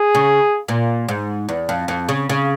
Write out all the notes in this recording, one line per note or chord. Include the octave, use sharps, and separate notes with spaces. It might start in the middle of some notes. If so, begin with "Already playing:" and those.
Already playing: G#4
C#3
A#2
G#2
E2
F2
F2
C#3
C#3